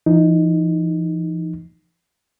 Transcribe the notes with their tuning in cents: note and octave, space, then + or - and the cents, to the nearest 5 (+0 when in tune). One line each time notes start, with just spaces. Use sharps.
E3 +45 D#4 +0